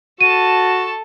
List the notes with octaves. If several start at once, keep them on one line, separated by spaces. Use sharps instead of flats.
F#4 A4 A5 D#7